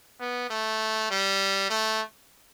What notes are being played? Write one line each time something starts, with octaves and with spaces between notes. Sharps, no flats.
B3
A3
G3
A3